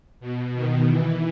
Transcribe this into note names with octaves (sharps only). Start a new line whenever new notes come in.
B2
D#3
E3